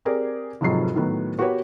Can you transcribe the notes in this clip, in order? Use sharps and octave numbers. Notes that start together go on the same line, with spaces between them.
C4 G4 G#4 A#4 D5
F1 G#2 C3 F3 F#3 C7
A2 D#3 F#3 B3
B3 F#4 G4 A#4 B4 C#5